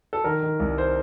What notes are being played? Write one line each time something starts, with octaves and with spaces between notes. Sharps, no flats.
A4
D#3 A#4
D#3
C2
C5